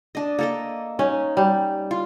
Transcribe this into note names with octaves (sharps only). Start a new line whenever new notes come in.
D4 D#5
A#3 A4 D#5
C#4 D#4
G3
F4